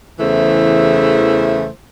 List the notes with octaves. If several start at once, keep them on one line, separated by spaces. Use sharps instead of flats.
E2 C#3 E3 A3 E4 C5